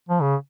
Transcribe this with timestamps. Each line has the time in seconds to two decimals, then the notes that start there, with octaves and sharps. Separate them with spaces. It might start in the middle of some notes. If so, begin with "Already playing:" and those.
0.09 F3
0.22 C#3